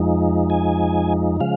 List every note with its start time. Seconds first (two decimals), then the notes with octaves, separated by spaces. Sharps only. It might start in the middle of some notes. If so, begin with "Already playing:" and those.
Already playing: F2 F3 G#3 D#4
0.50 G#5
1.40 C#3 F3 G#3 F5